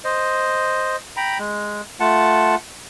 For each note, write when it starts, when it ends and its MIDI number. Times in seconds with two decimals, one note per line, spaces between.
0.04 0.96 72
0.04 0.96 75
1.17 1.38 79
1.17 1.38 82
1.17 1.38 83
1.39 1.81 56
2.00 2.55 57
2.00 2.55 65
2.00 2.55 78
2.00 2.55 81